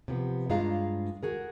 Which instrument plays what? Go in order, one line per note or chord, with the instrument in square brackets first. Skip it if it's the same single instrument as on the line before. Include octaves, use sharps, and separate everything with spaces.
[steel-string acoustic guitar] C3 F3 B3
G2 G#3 D4 F4 F5 A#5
F#4 G#4 A#4